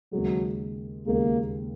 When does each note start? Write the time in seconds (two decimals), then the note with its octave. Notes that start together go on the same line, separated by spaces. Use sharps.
0.12 D#2 C#3 F#3 G#3
1.06 D#2 C#3 G#3 A#3